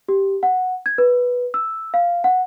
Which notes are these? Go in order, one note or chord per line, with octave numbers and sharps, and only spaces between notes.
G4
F#5
G#6
B4
E6
F5
F#5